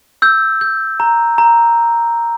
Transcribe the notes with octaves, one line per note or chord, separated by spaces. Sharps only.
E6 G6
G6
A#5
A#5